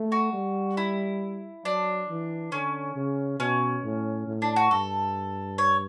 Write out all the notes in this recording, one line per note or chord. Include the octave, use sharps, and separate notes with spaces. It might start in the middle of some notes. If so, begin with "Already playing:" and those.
Already playing: A3
F#4
G3
E4
F#3 D4
E3
D3 C#4
C#3
B2 C#4
A2
A2
D4
F#4
G2 A4
C#5